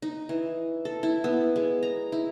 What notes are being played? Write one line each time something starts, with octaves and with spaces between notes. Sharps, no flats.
D#4
E3
A4
E4
B3
G#3
A#5
E4